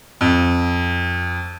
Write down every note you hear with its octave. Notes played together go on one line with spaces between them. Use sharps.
F2